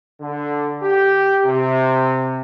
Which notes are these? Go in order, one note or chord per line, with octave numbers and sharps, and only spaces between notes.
D3
G4
C3